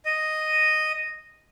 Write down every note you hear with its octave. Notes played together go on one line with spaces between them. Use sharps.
D#5